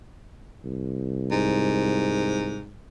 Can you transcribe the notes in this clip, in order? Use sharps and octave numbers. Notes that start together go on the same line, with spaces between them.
C2
G#2